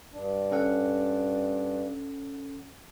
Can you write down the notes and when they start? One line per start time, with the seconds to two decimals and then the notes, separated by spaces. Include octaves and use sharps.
0.13 G2 D4
0.52 C#4 A4 F#5